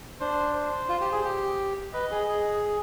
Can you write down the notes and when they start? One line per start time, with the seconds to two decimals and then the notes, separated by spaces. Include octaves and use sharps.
0.21 D4 C5
0.55 C5
0.89 F4
1.01 G4
1.12 G#4
1.25 G4
1.94 B4 D#5
2.11 G#4
2.28 G#4